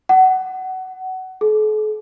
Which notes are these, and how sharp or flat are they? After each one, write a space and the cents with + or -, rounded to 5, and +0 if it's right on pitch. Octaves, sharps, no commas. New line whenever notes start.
F#5 +20
A4 -45